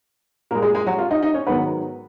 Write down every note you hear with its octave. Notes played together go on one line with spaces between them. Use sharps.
A#2 G#3 A#3 A#4
G#3 G#4
G#3 G#4
F#3 F#4
F4
D#4 D#5
D#4 D#5
C#4 C#5
G#2 D#3 F#3 B3 B4